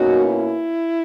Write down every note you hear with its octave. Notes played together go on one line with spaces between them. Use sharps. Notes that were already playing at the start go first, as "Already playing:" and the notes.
Already playing: B2 A#3 C#4 D#4 F#4
E4